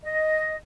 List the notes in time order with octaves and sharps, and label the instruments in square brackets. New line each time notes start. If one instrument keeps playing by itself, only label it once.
[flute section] D#5